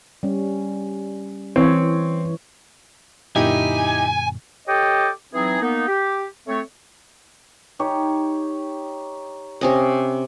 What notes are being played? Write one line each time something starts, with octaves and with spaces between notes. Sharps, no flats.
G3 C#4
E3 C4 C#5
F#2 A#2 D3 D#4 E4 G4 G#5
G4 A4 C#5 D#5 G5 D6
E3 F#3 C4 D#4 G#4
A#3 B3 D#4
G4
A3 C4 C#5
D#4 G4 C#5
C3 C#4 D#5